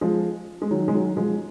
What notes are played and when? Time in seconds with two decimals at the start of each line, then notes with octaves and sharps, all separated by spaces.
0.01 F3 G#3
0.62 G#3
0.71 D#3 F#3
0.88 G#3
0.94 D#3 F#3
1.17 F3 G#3